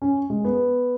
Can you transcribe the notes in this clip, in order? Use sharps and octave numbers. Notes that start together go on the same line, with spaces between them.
C#4
G#3
B3